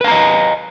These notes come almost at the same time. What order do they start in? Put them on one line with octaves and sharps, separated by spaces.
B4 F5 A#5 D#5